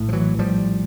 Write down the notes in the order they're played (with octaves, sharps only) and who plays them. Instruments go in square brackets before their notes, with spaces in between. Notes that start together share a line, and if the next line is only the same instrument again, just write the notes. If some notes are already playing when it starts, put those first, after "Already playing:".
Already playing: [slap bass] A#1 A2
F3
E3 F#3
F3 G3